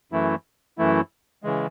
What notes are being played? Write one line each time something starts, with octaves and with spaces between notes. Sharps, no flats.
F#2 E3 A3 E4
F#2 E3 A3 E4
C#3 E3 G#3